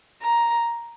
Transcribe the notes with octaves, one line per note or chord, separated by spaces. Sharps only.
A#5